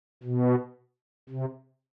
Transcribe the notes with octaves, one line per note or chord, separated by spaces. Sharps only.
B2
C3